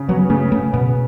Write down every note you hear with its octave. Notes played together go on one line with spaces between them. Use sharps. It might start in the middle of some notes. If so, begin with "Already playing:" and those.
Already playing: C#3
F#3 B3
C#3 A3
C#3 A3
B2 B3